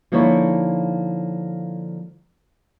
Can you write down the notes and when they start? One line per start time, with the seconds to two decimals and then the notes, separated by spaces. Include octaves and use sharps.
0.12 D3 F3 A#3 D#4 E4 C#5